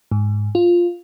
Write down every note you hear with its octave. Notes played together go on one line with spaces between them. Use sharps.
G#2
F4